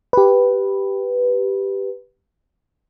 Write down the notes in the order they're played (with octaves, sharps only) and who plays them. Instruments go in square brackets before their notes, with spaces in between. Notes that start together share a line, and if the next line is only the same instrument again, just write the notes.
[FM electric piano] G4 B4